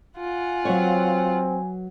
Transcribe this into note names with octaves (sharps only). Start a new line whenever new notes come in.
F4 F#5 G#5
F#3 C4 B4 C#5